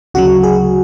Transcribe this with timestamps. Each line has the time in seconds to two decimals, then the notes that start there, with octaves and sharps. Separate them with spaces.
0.14 D2 C#3 F#3 F#4
0.43 G#4